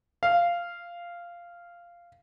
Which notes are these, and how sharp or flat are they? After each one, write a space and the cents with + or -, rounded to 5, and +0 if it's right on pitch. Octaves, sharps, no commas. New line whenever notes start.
F5 -10